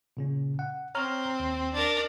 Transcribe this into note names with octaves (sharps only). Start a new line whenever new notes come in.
A#2 C#3 C#4
F#5
C4 C#5 A#5 F6
D#2
D4 A#4